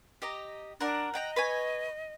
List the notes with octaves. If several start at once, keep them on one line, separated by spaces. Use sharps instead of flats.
G4 D#5 A#5
D4 A#4 F#5 A#5
D#5 F#5 G5 A#5
B4 C#5 G#5